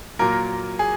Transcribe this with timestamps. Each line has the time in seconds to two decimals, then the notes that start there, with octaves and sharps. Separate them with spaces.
0.19 A#2 F#3 A#3 A#4
0.79 G#4